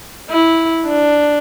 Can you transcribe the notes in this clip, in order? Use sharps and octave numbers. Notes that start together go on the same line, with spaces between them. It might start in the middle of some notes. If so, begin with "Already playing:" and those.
E4
D4